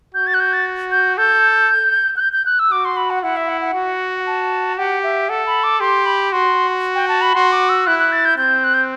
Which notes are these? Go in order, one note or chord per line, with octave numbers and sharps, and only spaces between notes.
F#4 G6
A6
F#6
G6
A6
G6
A4 G6
F#6
G6
G6
F#6
E6
F#4 D6
C6
B5
F#5
E4 F#5
E5
F#5
F#5
F#4
A5
G4 F#5
E5
A4 F#5
B5
D6
G4 C6
B5
F#4 C6
G5
A5
B5
F#4 C6
D6
E6
E4 F#6
F#6
A6
G6
C4 G6
F#6
G6